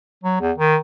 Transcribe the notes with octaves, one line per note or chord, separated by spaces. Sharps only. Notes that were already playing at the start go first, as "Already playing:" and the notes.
F#3
E2
D#3